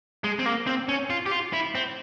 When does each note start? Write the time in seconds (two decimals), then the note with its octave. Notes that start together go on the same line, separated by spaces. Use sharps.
0.24 G#3
0.39 C4
0.46 A#3
0.67 C4
0.89 C#4
1.10 F4
1.26 G4
1.32 F4
1.53 E4
1.75 C4